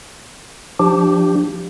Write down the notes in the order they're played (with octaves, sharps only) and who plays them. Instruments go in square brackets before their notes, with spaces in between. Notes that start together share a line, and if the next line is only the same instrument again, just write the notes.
[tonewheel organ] F3 D4 G4